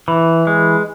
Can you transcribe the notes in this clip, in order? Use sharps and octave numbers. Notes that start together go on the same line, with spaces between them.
E3
G#3